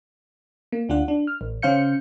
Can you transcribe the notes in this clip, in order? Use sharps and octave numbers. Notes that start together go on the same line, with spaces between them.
A#3
D2 D4 F4 F#5
D4
F6
A1
C#3 C#4 C5 F5 G6 C#7